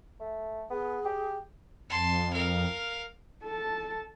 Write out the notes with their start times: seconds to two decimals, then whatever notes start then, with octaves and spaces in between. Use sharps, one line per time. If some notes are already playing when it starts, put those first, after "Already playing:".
0.20 A3
0.70 B3 G#4
1.05 G4
1.90 F2 A5 C6
2.33 A#4 F5
3.43 A4 A5